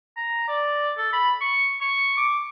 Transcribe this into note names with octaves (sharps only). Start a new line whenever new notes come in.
A#5
D5
A4
B5
C#6
C#6
D6